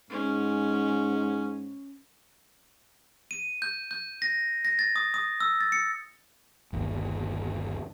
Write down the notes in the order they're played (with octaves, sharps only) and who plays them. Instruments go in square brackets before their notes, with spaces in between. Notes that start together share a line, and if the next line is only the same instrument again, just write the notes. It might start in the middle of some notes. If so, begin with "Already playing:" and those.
[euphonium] G#2 [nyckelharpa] C#4
[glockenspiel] D#7
G6
G6
A#6
A#6
A6
D#6
D#6
E6
A6
C#7
[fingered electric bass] G1 D#2